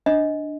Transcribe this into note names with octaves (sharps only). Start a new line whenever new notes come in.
D4 D#5